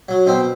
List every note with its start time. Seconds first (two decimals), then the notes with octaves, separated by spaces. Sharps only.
0.09 F#3
0.27 B2 C4